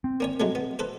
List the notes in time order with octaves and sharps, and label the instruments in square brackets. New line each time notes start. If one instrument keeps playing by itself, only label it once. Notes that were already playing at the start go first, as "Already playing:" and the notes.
[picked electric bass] C4
[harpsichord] A#3 C#4 C#5
F#3 G#3 A3
B3
A4 B4 C5